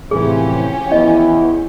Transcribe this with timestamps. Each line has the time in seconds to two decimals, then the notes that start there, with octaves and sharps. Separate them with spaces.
0.11 A2 C3 E3 F3 C#4 G4 G#4
0.92 E2 E4 D#5